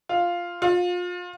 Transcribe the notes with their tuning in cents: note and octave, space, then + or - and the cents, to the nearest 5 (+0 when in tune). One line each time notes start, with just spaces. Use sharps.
F4 +0
F4 +30